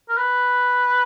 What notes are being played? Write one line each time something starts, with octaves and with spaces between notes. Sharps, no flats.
A#4
B4